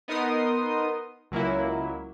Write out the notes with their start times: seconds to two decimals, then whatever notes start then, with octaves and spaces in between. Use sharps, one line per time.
0.08 B3 D#4 A#4 C6 D#6
1.31 C#2 F#3 A#3 E4